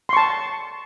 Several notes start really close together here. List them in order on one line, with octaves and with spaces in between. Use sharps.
C6 C#6 A5